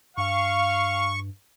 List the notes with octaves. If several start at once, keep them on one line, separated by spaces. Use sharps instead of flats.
G2 F5 C#6